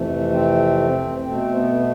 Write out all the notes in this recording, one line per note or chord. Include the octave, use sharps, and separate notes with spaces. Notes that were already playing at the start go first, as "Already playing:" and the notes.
Already playing: F2 C3 E3 A3
C4
B2 A3 C4
B3